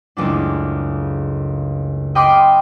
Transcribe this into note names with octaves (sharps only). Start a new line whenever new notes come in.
F#1 C#2 A3 D4
D#5 G5 B5 C6 D6 F6